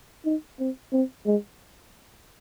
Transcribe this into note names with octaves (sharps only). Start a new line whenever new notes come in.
D#4
C4
C4
G#3